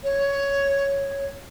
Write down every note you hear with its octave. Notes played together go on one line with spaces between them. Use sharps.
C#5